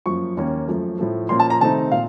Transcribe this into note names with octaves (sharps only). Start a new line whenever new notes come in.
F#2 F3 A#3 C#6
D#2 D#3 A#3 C#4
F#2 F3 A3
A2 F3 A3
A#2 F3 A#3 C#4 C6
A5
A#5
C3 D#3 A3 C4 D#4 A5
A#2 F5